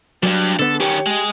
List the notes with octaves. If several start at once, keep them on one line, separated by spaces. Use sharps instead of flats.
E2 G2 F#3
D3 B3 A4
D#3 C#4 G4
G#3 G#4